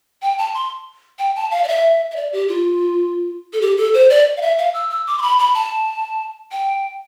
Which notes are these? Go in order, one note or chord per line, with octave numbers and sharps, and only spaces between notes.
G5
A5
C6
G5
A5
F5
D5
E5
E5
D5
G4
F4
A4
G4
A4
C5
D5
F5
E5
F5
E6
E6
D6
C6
B5
B5
A5
G5